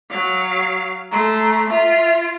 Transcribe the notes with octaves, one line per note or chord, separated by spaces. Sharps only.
F#3 F5
A3 A#5 C6
F4 E5